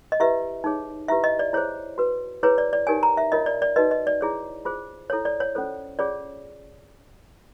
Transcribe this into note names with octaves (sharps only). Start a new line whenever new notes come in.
D#5
E4 G4 B4 E5
D#4 G#4 C#5
E4 G4 B4 E5
D#5
D5
E4 G#4 C5 C#5
F#4 B4
E4 G#4 B4 C#5
D5
D5
D#4 G4 A#4 C#5 G#5
A#5
E5
D4 F4 A#4 C#5 D#5
D5
D5
D#4 F#4 B4 D#5
D#5
D5
E4 G#4 C#5
F4 G#4 C5
E4 A4 C#5
D5
C#5
C#4 F4 A4 C5
C#4 F4 G#4 C#5 D5